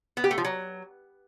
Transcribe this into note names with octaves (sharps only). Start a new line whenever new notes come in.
B3
G4
A3
F3
F#3